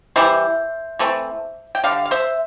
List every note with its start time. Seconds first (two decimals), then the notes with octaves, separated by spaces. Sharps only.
0.16 E3 G3 C5 E5
0.99 E3 A3 C4
1.75 G5
1.84 D3 G3 F5
2.05 F5
2.11 C5 E5